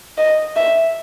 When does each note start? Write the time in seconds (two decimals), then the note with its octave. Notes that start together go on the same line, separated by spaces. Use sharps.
0.18 D#5
0.56 E5